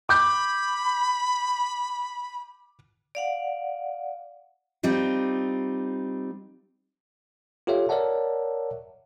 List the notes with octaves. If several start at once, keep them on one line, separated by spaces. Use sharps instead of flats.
B5 D6 G6
D5 F5 F#5
G3 C4 D#4 F4
F4 G4 A4 C#5 E5 F5
A#4 C#5 D5 E5 F#5 A5